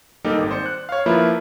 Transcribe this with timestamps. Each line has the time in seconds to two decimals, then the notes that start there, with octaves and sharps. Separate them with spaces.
0.25 G3 A#3 D#4 G4 A4
0.38 G#1
0.51 C5 D5 C#7
0.66 F#6
0.89 C#5 F5
1.06 F3 A#3 E4 F4 B4